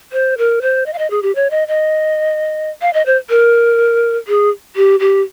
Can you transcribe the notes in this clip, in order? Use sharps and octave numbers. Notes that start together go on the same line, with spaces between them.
C5
A#4
C5
D#5
F5
D#5
G#4
G4
C#5
D#5
D#5
F5
D#5
C5
A#4
G#4
G4
G4